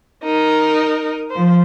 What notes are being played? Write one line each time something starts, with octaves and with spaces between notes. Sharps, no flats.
D#4 A#4
F3 C5